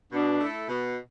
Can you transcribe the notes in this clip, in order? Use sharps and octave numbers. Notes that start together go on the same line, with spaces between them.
B2 D4
A3 E4 A4
B2